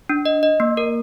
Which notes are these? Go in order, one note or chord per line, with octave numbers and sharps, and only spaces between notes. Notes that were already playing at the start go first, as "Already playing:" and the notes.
D4
D#5
D#5
A#3
A#4